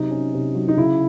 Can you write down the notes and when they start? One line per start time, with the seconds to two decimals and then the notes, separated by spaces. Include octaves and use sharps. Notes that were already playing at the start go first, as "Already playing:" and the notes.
Already playing: C3 F#3 D#4
0.11 C#4
0.34 C3
0.55 F#3
0.68 D#4
0.76 C#3 E4